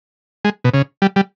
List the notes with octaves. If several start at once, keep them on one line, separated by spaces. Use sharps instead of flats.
G#3
B2
C#3
G3
G3